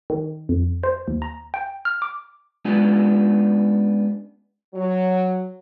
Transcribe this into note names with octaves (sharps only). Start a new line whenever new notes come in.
D#3
F2
C5
D#2
A#5
G5
F6
D6
G#3 B3 C#4 D4 F4 G4
F#3